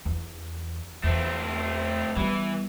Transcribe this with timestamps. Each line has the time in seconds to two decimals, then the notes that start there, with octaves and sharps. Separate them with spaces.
0.05 E2
1.04 E2 A3 C4
2.16 E3 G3 B3